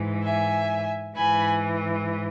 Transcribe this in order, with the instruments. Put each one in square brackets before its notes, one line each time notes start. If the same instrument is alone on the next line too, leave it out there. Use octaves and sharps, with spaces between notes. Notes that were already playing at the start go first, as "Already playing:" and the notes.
Already playing: [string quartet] G#2 E3
E5 G#5
G#2 E3 G#5 B5